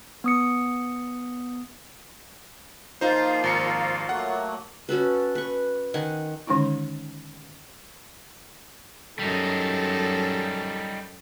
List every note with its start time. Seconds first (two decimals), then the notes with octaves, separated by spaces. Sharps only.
0.24 B3 D#6 C#7
3.01 F3 A#3 D#4 F4 C5
3.44 G#1 A#5 C#7
4.09 F#3 A3 A#3 F#5
4.89 C#4 F#4 A4 B4
5.35 B4 C#6
5.94 D#3 F#5 G#5
6.47 D3 D#3 G#3 C#4 D#4 E4
9.19 F#2 G3 D#4 A4